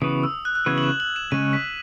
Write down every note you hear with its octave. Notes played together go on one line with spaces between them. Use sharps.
C#3 E3 B3 F#4 B4 D#6
E6
F#6
F#6
C#3 E3 B3 F#4 B4 G#6
F#7
E7
F#7
E7
C#3 G#3 C#4 D#7
B6